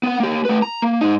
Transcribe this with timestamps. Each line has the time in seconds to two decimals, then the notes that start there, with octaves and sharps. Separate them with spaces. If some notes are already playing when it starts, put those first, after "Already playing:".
0.03 B3 F#5
0.20 A#3 G4
0.45 A3 B4
0.62 A#5
0.82 A#3
1.01 G#2 D#4